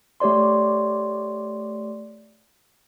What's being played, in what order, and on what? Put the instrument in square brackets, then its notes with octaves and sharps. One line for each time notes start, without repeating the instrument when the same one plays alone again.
[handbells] A3 G4 C#5 D5 C6